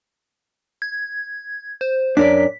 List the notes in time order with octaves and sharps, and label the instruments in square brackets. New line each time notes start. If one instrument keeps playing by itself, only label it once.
[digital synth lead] G#6
C5
[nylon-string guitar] F#2 [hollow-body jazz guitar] D4 A#4 D5 [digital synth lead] B6